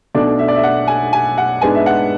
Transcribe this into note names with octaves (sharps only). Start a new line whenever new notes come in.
B1 B2 A3 D4 D5
E5
D5
E5
F#5
G#5
G#5
F#5
G#2 G#3 B3 D4 G#5
E5
F#5